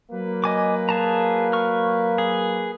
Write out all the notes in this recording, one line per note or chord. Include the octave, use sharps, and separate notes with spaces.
F#3 A#3 B4
D#5 G#5 D6
G#4 A5 A#5
C#6 F6
G#4